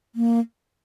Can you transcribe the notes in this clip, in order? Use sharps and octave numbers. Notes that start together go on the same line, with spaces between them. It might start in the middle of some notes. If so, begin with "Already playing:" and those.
A#3